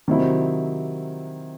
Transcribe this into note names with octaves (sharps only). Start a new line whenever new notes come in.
C3 D#3 F#3 C4 E4